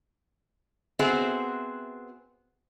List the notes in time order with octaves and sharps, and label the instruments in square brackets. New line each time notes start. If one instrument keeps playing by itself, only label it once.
[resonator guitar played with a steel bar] B3 C4 F#4 G#4 C5 E5